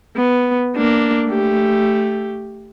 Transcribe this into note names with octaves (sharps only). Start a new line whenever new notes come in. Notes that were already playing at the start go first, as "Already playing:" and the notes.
B3
A#3 D4
A3 G4